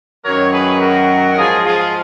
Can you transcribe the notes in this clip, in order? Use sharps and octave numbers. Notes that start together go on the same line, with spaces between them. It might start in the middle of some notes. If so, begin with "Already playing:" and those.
F#2 D#3 F#3 A#4 C#5
G#4 B4
F#4 A#4
G#2 F3 F4 G#4
F4 G#4